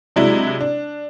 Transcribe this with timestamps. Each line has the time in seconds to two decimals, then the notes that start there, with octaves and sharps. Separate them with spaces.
0.16 C3 F#3 G#3 D4 E4
0.61 D4